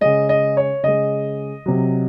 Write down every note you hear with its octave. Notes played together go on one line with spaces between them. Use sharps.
C#3 G#3 D#5
D#5
C#5
C#3 G#3 D#5
C3 F#3